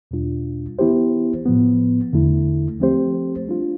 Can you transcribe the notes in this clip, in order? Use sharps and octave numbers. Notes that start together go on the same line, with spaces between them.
E2 B2 G3 D4 F4
E3 B3 E4 G4 C5
A2 F3 B3
E2 D3 A3 E4
F3 A3 C4 G4 C5
G3 D4 F4